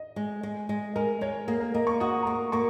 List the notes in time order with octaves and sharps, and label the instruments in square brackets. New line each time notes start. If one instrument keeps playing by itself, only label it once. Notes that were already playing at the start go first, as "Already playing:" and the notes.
Already playing: [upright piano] D#5
[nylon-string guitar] G#3
G#3
G#3
[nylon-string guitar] G#3 [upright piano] A#4
[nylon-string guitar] G#3 [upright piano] C#5
[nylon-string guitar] A#3 [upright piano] G#4
[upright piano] A#4
[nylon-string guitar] A#3 [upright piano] D#5
[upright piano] C#6
[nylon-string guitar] F#4 [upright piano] D#6
[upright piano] A#5
[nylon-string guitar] A#3 [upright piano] C#6
[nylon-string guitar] A#3 [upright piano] C#6